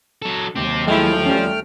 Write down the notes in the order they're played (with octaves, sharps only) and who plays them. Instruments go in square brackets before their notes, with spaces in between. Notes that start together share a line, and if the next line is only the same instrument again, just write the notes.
[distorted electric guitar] F#3 A4
[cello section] D#2 F#3 [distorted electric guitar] C4 G4
[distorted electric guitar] F3 [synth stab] G#3 E4 [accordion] A3 G5 F6
[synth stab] G3 C#4